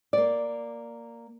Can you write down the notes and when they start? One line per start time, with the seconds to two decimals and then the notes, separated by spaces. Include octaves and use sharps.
0.13 A#3 D5